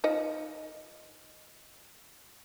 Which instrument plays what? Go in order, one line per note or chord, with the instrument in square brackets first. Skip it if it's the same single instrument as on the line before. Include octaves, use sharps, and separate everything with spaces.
[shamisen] F3 D#4 D#5